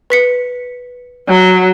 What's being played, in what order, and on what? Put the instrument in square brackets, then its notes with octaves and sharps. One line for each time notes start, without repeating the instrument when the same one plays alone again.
[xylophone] B4 B6 C#7
[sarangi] F#3